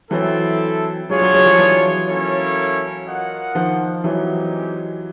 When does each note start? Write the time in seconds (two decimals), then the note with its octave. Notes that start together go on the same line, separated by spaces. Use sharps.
0.11 E3 F#3 C4 E4 A4
1.09 F#3 G#3 D4 F4 G#4 C#5
1.21 F#3 G#3
1.34 F#3 G#3
1.46 F3 G3
1.58 E3 F#3
2.07 A#3 C#4 E4 A4 C#5
3.06 F4 A#4 D#5 F#5
3.55 D#3 F3
4.04 E3 F#3 G#3 C4 D#4 G4